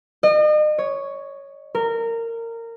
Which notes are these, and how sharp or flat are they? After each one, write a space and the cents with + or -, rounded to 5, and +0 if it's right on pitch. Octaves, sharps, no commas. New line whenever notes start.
D#5 -40
C#5 +5
A#4 -20